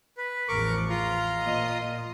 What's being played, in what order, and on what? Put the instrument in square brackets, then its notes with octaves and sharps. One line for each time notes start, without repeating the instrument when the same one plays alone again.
[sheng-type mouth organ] B4
[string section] A1 E2 F3 [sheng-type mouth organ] A#4 C#6 D6
[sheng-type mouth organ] F4 A#5 C6
[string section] A#2 F3 D#5